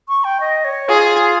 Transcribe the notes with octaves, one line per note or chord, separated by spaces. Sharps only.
C#6
G5
D#5
C#5
F4 G#4